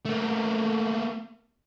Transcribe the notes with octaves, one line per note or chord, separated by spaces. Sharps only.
A3 A#3